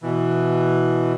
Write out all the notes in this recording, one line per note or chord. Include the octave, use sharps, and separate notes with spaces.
B2 E3